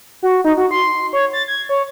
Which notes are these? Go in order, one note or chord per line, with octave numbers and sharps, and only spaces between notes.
F#4
D#4
F#4
C6
C#5
A6
G#6
C#5